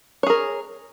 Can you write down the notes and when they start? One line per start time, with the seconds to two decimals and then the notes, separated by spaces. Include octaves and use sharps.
0.23 C#5
0.26 G#4
0.30 A#4